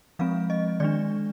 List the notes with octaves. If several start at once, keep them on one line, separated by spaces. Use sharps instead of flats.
F3 G#3 C4 F5
D#5
D#3 G#3 D4 D5